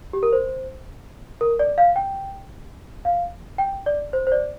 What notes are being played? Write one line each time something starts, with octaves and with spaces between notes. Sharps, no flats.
G4
A#4
C5
A#4
D5
F5
G5
F5
G5
D5
C5
C5
D5